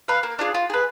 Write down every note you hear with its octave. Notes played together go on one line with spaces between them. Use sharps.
B4 F5
A#3
D4 F4 G#4
F4
G#4 B4